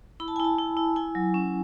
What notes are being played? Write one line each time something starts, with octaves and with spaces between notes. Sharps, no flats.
E4 B5
A5
G#5
E4 A5
E4
E4
E4 G#5
F#3
C#4